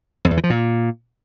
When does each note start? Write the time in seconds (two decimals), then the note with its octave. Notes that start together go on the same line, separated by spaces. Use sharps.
0.25 F2
0.31 E2
0.37 E3
0.44 F3
0.50 A#2